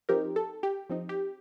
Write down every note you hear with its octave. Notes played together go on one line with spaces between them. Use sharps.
F3 C4 D#4 G4 A#4
A4
G4
F3 C4 D#4
G4